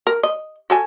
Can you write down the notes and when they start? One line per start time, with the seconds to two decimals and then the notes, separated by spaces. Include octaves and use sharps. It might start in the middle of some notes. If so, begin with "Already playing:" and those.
0.07 A#4
0.23 D#5
0.70 F#4 A4 G#5